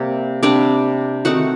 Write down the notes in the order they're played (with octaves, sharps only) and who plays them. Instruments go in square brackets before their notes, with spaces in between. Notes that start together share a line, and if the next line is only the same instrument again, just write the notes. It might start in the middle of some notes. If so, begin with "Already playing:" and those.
Already playing: [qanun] C3 G3 A#3 C4
C3 G3 C4 D4 D5
D#3 A3 C4 D#4 F#4 F#5